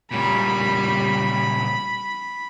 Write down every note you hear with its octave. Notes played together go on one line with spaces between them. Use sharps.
A#2 C#3 G3 B5